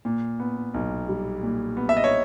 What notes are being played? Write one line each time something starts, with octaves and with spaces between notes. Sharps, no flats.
A#2
B3
B1
G3
A#2
B3
E5
D#5
C#5